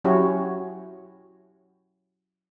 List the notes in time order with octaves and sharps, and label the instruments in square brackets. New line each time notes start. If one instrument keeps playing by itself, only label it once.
[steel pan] F#3 C#4 E4 F#4 G4 C#5